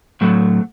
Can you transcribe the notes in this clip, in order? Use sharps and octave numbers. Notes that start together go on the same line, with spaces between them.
A2 F#3 A3